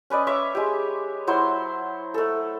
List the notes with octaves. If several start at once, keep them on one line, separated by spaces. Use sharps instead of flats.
C#4 B4 D5 D#5
C#5 E5 C#6 D6
G#3 G4
F#3 E4 C5 C6
A3 A4